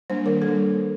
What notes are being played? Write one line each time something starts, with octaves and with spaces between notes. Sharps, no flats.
G3 A#3 D4 C5
D#3 A#4
G3 A#3 D4 A4